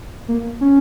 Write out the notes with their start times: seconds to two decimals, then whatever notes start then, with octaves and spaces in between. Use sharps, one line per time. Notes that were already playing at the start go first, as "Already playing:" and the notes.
0.28 A#3
0.61 C#4